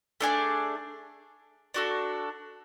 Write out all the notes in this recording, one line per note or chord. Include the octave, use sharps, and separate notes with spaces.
A3 D4 G#4 D5
D4 F#4 A4